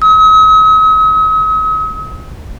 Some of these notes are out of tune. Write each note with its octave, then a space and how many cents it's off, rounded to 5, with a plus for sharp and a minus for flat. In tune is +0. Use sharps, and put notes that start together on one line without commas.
D#6 +45